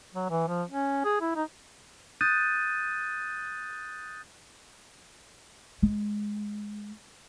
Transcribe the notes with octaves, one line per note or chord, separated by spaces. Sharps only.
F#3
E3
F3
C#4
G#4
E4
D#4
D#6 F#6 G6 A6 D#7
G#3